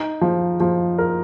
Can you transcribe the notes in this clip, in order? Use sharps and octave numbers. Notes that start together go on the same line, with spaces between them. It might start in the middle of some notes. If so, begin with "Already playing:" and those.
Already playing: D#4
F3
F3
A#4